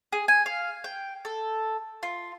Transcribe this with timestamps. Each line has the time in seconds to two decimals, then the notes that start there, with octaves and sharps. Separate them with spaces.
0.12 G#4
0.28 G#5
0.46 F5
0.84 G5
1.25 A4
2.03 F4